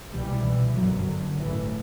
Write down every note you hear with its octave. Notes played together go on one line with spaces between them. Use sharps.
C2 B2 E3 G3
C2 B2 E3
G1 F#2 D3 F#3
F#1 F#2 D3
A1 G2 E3